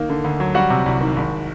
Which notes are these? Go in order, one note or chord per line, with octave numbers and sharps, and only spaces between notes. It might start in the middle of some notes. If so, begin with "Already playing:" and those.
Already playing: D#3 A#3
D3
D2
F#3
G3 F#4 F#5
C3
C2
D#3
G#1